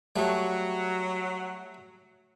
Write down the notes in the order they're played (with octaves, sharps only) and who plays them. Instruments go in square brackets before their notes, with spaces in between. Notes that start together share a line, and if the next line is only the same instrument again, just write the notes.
[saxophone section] F#3 [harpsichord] G3 A3